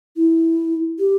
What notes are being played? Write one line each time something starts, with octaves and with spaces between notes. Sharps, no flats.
E4
G4